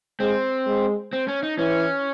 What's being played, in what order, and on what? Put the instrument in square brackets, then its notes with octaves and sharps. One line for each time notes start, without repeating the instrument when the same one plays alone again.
[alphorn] G#3 [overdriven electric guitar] C4
[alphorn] G#3
[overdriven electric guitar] C4
C#4
D#4
[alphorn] E3 [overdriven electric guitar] C#4